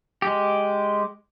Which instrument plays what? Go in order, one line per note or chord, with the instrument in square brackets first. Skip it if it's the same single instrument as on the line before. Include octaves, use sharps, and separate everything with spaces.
[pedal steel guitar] G#3 G4